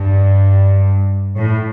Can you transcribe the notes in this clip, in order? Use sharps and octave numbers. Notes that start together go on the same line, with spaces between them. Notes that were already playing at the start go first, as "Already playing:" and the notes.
Already playing: G2
A2